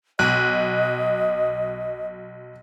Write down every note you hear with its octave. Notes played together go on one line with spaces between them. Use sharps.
B1 D#5 F#6